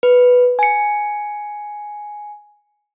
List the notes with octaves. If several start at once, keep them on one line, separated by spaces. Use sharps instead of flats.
B4
G#5 C#7